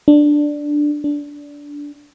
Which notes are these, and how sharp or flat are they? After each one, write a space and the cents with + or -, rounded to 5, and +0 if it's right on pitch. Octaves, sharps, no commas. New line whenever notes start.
D4 +5
D4 -15